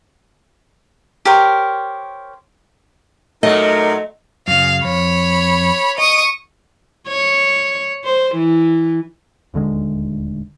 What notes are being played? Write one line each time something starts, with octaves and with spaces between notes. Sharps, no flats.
G4 A#4 C5 C#5
A#2 F#3 A3 D#4 A#4 D#5
F#2 C#3 F5
F2 C#5 B5
D#5 C#6 D#6
C#5
C5
E3
D#1 D2 D3 G#3